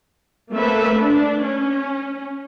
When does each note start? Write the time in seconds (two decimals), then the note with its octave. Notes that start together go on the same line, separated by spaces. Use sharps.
0.53 A3 A#3 C4 A4 B4 E5
0.96 D4
1.43 C#4